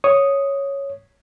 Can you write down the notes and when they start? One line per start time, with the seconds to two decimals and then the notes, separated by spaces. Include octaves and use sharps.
0.04 C#5 C#6 D#6